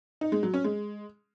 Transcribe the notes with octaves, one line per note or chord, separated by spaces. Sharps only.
D#4
G#3
F#3
C#4
G#3